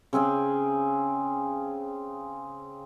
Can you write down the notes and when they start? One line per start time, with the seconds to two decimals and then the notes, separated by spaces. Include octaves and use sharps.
0.13 C#3 C4 G#4 G#5